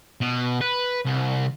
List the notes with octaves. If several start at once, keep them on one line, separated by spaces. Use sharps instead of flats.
B2
B4
C2